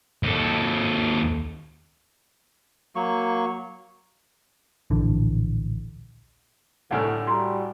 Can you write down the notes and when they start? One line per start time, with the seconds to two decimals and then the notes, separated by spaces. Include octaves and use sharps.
0.23 D#2 A4
2.96 F#3 A#3 C#6
4.90 D1 A#1 D3 E3
6.91 C2 A2 D3 A3 F#5 G#5 F6
7.27 G3 F#4 A#5 C6